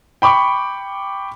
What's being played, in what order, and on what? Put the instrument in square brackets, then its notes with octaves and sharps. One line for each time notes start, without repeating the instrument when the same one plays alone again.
[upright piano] G5 B5 C#6 D6